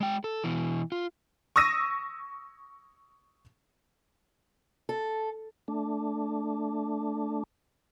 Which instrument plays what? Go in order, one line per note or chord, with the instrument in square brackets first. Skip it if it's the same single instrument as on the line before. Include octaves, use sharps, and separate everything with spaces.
[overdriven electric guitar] G#3 G5
A4
B2 E3
F4
[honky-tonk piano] C#6 D#6 E6 A#6 D#7
[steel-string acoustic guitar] A4
[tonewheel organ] A3 D4